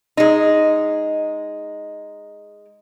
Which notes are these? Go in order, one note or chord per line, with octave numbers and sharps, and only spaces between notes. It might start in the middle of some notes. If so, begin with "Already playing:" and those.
G#3 D#4